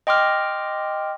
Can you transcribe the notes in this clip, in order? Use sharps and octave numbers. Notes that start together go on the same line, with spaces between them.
D#5 G5 C6 D6 F6